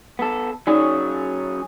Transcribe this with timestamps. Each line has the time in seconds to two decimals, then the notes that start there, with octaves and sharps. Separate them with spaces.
0.19 B3 A4
0.67 F#3 C#4 D#4 G#4 D5